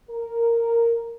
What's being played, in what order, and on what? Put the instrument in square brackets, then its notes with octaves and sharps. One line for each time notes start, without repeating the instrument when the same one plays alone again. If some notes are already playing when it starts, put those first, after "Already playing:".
[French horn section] A#4